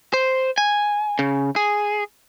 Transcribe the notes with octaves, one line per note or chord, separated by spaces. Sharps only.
C5
G#5
C#3
G#4